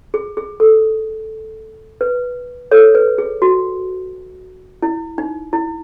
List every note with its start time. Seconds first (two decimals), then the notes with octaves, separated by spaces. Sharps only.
0.14 G#4
0.37 G#4
0.60 A4
2.01 B4
2.71 A4 C#5
2.95 B4
3.18 G#4
3.42 F#4
4.83 E4
5.18 D#4
5.53 E4